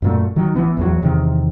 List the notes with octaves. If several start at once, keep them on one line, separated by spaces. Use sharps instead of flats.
F#2 A#2 A3
D#3 F#3
A1 E3 B3
A1 E2 F#3
E2 C3 D#3